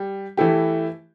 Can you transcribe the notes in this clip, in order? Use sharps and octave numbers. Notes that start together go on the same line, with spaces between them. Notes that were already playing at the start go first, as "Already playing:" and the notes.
Already playing: G3
E3 A3 E4 G4